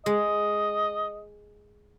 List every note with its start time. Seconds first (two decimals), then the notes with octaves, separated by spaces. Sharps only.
0.06 G#3 D#5